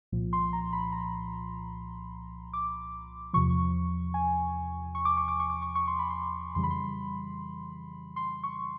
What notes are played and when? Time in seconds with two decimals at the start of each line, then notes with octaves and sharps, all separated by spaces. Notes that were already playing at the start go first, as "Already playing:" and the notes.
0.12 C2 A#2 F3
0.33 C6
0.53 A#5
0.73 B5
0.92 A#5
2.53 D6
3.33 E2 C3 F3 C#6
4.14 G#5
4.95 C#6
5.05 D6
5.17 C#6
5.28 D6
5.40 C#6
5.50 D6
5.62 C#6
5.75 C#6
5.88 C6
5.99 B5
6.10 C6
6.55 F2 C#3 E3 G3 C6
6.63 B5
6.70 C6
8.16 C6
8.44 C#6